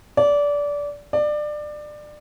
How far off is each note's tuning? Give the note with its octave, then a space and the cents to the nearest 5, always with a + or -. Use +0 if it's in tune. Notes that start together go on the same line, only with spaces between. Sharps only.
D5 -20
D5 +25